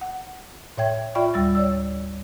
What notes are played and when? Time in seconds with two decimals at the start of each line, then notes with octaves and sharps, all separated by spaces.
0.01 F#5
0.78 A2 C#5 E5 G5 G#6
1.15 F4 D5 E5 G5 B5 C#6
1.34 D2 G3 E6 A6
1.55 C#5 D5 E6